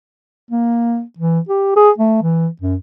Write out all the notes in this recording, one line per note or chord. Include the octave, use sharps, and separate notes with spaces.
A#3
E3
G4
G#4
A3
E3
F#2